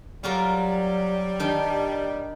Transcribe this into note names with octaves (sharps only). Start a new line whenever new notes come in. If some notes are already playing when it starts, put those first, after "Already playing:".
F#3 G3 F4 F#4 A#4
D#3 D4 G5